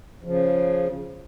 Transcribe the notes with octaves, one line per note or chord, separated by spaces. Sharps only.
C#3 F3